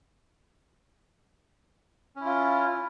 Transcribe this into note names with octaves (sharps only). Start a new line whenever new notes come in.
C#4 E4 F4